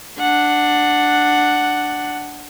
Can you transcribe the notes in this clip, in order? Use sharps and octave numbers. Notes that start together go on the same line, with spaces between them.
D4 F#5